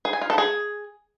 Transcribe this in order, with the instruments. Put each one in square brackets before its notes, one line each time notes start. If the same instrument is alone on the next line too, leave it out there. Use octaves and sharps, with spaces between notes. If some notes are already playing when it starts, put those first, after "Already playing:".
[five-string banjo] G#4
G#5
F4
A4
G#4